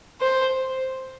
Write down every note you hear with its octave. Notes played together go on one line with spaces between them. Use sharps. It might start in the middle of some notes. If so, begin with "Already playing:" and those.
C5